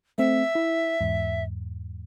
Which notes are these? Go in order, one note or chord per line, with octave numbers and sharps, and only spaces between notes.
A3 C4 E5
E4
E2 G#2